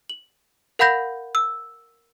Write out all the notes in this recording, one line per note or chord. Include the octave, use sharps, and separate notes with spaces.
F#7
A#4 F5 F#5 B5 G6 A#6
E6